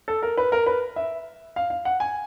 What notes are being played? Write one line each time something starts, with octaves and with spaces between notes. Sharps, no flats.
A4
A#4
B4
A#4
B4
E5
F5
F5
F#5
G#5